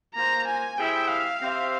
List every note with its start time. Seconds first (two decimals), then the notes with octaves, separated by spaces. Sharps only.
0.15 A#3 F4 C5 A#5
0.47 G#5
0.77 G3 C4 E4 G#4 E5 G5
1.09 F5
1.41 C4 G4 C5 E5